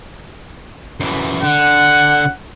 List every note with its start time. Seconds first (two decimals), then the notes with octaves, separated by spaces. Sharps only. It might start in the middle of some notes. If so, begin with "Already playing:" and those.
1.00 F#2 E3
1.43 D3 F#5